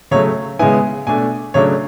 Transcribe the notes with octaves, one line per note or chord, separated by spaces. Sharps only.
C#3 F#3 A3 C#5
C#3 G#3 B3 E4 G#5
B2 A3 D4 G#5
C#3 F#3 A3 D4 C#5